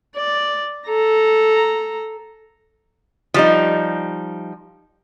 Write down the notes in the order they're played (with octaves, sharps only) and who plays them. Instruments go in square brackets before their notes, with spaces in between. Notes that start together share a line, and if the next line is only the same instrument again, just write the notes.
[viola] D5
A4 A#5
[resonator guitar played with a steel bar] F3 G3 D#4